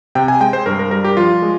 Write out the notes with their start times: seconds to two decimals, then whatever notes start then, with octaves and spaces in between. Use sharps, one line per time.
0.15 C3 G5
0.28 G#5
0.40 G#3 G5
0.53 C5
0.66 G2 A#4
0.79 A#4
0.91 G3 A#4
1.04 G4
1.17 F3 F4
1.42 G#3